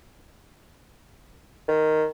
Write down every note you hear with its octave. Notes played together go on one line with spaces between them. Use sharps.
D#3